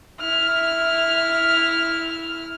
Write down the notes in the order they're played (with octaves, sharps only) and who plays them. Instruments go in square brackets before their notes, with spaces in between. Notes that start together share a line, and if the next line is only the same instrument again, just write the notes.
[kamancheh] E4 F6